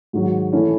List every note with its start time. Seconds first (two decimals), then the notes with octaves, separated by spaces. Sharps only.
0.13 G#2 D#3 F#3
0.53 E3 A3 C#4 E4